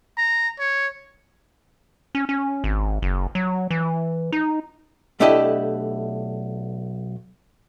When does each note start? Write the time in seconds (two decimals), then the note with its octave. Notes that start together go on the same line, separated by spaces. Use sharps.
0.18 A#5
0.59 C#5
2.15 C#4
2.29 C#4
2.64 G#1
3.02 F#1
3.35 F#3
3.71 E3
4.32 D#4
5.20 B1 A3 D4 E4 G4 D#5